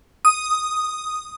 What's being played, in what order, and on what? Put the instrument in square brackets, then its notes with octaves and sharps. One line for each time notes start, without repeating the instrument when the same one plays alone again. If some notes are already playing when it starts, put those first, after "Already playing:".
[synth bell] D#6